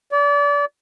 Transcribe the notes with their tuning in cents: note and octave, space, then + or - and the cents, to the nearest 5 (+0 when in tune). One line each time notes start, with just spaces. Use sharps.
D5 -30